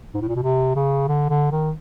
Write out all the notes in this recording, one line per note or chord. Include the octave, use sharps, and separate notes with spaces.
G#2
A2
A#2
B2
C3
C#3
D3
D3
D#3